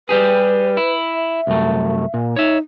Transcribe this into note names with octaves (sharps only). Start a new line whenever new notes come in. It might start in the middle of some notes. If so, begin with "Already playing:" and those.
G3 G4 G#4 B4
E4
E5
C2 F#2 A3
A#2
D#4 C#5 E5